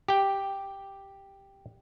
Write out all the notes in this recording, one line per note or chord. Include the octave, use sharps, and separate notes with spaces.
G4 G5